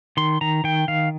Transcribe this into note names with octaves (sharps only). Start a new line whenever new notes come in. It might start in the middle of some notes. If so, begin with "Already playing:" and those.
D#3 C6
D#3 A#5
D#3 G5
D#3 F5